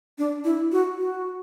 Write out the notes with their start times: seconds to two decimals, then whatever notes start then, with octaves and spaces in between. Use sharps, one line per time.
0.18 D4
0.44 E4
0.72 F#4
0.99 F#4